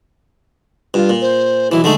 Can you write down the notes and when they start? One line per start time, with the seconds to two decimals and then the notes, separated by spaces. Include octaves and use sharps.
0.94 G2 F4
1.10 A#2
1.21 C5
1.72 B1 E3 E4
1.84 D3 G#3 A3 D#4